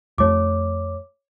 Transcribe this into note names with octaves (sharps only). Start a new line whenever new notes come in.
F2 A3 C#5 D6